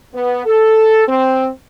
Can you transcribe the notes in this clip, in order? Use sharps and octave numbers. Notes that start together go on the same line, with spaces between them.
B3
A4
C4